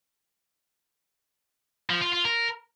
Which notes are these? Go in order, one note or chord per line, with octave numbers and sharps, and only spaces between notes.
F3
F4
F4
A#4